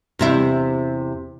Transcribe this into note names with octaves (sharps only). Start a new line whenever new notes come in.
E2 C3 E4